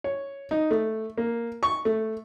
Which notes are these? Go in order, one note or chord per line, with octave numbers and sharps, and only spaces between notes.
C#5
D#4
A3
A#3
C#6
A3